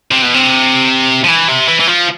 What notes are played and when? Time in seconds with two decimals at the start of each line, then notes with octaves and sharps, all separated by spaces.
0.11 C3
0.22 B2
0.34 C3
1.24 F3
1.28 E3
1.48 C3
1.68 E3
1.80 E3
1.88 F3